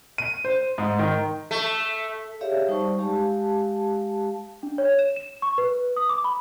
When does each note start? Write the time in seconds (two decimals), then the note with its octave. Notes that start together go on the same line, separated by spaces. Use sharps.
0.18 D#7
0.45 C5
0.78 G#2
0.99 D#3
1.51 A3
2.41 G4 G#4 C#5 D5 E5 F5
2.68 G3 D#4 C5 D5 A5 C#6
2.98 G#3 G4 F5 A5
4.63 D4
4.78 C#5
4.99 E7
5.16 E7
5.42 C#6
5.58 B4
5.96 D#6
6.09 D6
6.24 B5